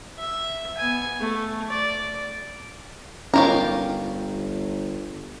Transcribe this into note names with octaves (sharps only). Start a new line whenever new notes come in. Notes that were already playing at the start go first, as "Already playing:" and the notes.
E5
B3 G#5
A3
D5
G1 C#4 D#4 F4 G4 A#4 C#5